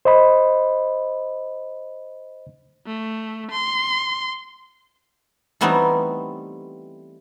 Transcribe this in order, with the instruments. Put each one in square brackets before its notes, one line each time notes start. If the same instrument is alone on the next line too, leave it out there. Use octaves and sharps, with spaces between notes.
[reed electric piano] C5 D#5 B5
[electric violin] A3
C6
[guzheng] E3 G3 A3 B3 C4 D#4